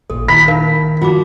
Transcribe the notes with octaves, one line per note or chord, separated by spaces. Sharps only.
A1 A#2 A4
D#3 E4 B5 B6
D#4 A#4 F5
F3 F4 F#4 D6